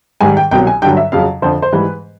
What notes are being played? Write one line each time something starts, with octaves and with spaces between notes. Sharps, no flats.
G#2 D#3 G3 G#5
G5
C2 B2 F#3 G5
G#5
G2 D3 F#3 G5
E5
F2 C#3 F#3 F5
F2 D3 F3 C5
C5
G#2 E3 G3 B4